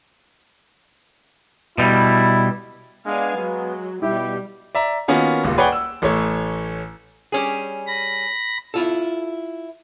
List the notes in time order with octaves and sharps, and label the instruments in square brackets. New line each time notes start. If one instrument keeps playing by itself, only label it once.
[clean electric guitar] B2 G3 [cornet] E4
[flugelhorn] G#3 [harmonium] B3 [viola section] D4 F5 G#5
[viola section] F#3 [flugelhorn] G#3
[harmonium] B2 [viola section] G3 [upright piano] E4 E5 [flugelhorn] G4
[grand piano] D5 E5 A#5
D#3 A#3 B3 C#4 F4 F#4
D#1 C#2
G#4 B4 C#5 D5 F#5 G5
E6
A1 A3 C#5
[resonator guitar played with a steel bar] G3 C#4 G#4
[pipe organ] B5 A#6
[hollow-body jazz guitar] E4 F4 A4